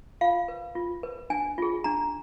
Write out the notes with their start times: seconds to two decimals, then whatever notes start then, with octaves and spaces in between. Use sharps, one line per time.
0.21 F4 F5
0.48 B4
0.75 F4
1.03 B4
1.30 D4 G#5
1.58 F4 G#4
1.84 D4 A#5